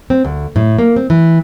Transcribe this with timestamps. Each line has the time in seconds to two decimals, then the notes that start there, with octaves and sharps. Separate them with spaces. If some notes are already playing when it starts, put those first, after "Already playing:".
0.10 C4
0.25 D2
0.56 A2
0.79 A#3
0.96 C4
1.10 E3